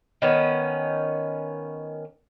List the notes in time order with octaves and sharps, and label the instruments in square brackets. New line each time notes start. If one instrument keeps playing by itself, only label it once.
[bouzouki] D#3 B3 C#4